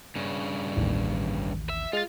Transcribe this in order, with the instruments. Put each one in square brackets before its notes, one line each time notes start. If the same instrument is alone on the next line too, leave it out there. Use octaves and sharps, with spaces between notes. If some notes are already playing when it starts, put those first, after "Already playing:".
[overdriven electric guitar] G2 C#3
[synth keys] A1 D#2
[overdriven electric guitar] E5
[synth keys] G#3 A6 [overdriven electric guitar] F4